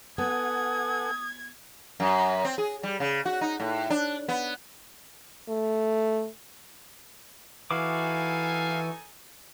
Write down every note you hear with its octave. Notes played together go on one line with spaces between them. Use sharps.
B3 A4 F#5 G#5 D#6 G#6
F#2
C4
G#4
G3
C#3
F#4
D#4
A2
D4
B3
A3
E3 D#4 E4 F#4 A4 F5 G#5 D6